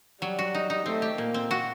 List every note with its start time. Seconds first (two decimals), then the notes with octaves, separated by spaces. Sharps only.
0.22 F#3 G3
0.39 F#4
0.55 D#4
0.70 D#4
0.86 A3 C4
1.02 G4
1.18 A#2 A#3
1.34 C4
1.51 F#4